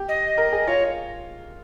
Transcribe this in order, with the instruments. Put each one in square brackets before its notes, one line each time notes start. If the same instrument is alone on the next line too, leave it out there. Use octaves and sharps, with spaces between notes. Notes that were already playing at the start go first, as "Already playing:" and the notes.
Already playing: [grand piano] G4
[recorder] D#5
[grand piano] A#4
G#4
[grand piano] F4 [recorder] C#5